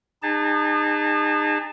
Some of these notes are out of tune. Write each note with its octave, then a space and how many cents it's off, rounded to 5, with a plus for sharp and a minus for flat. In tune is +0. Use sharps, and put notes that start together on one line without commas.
D#4 -30 G#4 -35 A5 +0